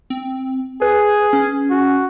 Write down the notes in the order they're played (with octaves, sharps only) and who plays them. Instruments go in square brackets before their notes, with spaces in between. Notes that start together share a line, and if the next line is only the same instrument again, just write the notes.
[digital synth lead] C4
[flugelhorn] G#4 [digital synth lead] B4
[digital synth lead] C#4
[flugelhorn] F#4